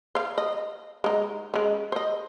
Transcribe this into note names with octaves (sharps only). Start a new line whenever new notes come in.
C5 F5
D#5
G#3 D#4
G#3 C#4
C5 D#5